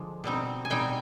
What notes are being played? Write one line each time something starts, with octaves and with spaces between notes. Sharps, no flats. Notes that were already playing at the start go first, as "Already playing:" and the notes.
Already playing: D3 F3 G#3 D4
B2 G3 C4 D#4
G#5
B2 G3 C4 D#4 G5